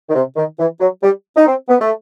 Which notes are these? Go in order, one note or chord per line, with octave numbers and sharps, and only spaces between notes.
D#3
C3
D#3
E3
F#3
G3
D#4
C4
B3
A3